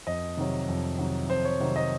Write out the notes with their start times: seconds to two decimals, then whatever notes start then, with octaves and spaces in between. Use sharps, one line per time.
0.07 F2 D#5
0.37 C3 D#3 F#3
0.69 F2
0.99 C3 D#3 F#3
1.29 F2 C5
1.45 C#5
1.60 C3 D#3 F#3
1.76 D#5